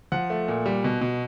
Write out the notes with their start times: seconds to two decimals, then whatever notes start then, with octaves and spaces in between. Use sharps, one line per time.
0.12 F3 F#5
0.30 A3
0.48 A#2
0.66 G3
0.84 B2
1.01 B2